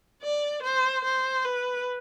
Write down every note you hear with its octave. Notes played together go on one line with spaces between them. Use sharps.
D5
C5
C5
B4